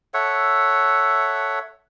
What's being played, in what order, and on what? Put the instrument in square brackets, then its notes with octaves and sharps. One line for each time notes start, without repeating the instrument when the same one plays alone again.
[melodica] A4 C#5 E5 F#5